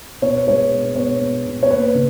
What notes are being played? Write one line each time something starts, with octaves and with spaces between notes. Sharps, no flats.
B2 C#5
B4
G#3 C#5
B2
B2 C#5
B2
B2
C#5
A#3 B4
C#3